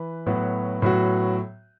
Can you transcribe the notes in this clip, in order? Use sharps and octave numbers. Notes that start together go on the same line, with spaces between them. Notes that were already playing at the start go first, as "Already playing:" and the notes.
Already playing: E3 B4
A2 F#3 B3 F#4
A2 F#3 B3 F#4